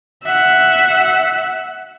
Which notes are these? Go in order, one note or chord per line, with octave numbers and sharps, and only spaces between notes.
E5 F#5